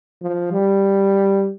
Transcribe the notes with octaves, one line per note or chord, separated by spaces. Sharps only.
F3
G3